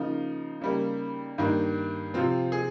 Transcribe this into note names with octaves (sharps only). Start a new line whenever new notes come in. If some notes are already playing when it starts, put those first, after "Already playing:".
Already playing: C#3 F3 A#3 D#4
C#3 G3 A#3
G2 D#3 A#3
C3 F3 C4 F4
G#4